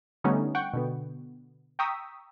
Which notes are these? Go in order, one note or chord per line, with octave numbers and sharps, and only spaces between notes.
D3 G3 A3 B3 C#4 D#4
F#5 G5 C#6
B2 D3 B3
G5 A#5 C#6 D#6 E6 B6